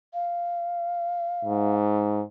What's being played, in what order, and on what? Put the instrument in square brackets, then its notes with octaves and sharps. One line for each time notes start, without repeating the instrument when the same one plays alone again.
[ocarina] F5
[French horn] G#2